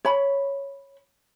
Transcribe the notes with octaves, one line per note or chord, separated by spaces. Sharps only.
C#5 B5